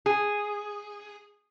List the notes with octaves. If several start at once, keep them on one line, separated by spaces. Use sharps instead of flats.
G#4